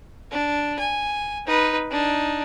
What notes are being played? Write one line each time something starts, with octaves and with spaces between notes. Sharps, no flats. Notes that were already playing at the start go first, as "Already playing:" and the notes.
D4
G#5
D#4 B4
D4 D#4